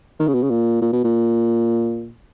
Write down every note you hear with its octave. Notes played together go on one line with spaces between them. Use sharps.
D#3
C#3
B2
C#3
A#2
A#2
B2
A#2